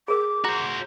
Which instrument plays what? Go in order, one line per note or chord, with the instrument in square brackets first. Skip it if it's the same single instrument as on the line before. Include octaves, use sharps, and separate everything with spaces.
[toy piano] G#4 A#4 [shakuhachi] D6
[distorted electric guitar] F#4 C5 [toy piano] A#5